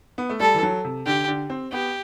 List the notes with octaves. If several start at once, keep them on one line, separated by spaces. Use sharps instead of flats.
B3
A3
G3 A4
E3
F#3
C3
D3 G4
D3
C4
B3 G4